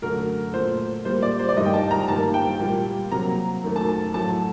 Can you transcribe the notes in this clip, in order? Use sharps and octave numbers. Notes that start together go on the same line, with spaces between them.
F#2 D3 A3 A#4
A#2 A3 C5
A#2 G3 A#3 C5
D5
C5
D5
G2 D#3 G3 D#5
G5
A5
A#5
G2 D#3 G3 A#3 A5
G5
A#2 G3 A#3
C3 F#3 A#3 A#5
F#2 D#3 A3
A5
A5
A2 F#3 A3 A5